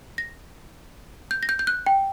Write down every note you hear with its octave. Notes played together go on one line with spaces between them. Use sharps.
A#6
G6
A#6
G6
G6
F#6
G5